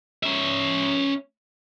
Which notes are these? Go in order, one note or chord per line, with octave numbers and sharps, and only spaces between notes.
C#4 E5